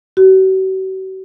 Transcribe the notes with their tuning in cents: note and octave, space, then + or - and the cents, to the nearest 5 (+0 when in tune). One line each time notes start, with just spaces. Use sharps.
F#4 +45